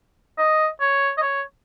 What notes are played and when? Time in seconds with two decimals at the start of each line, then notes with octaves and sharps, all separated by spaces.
0.38 D#5
0.81 C#5
1.18 D#5
1.22 C#5